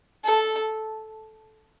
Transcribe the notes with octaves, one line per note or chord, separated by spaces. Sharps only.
A4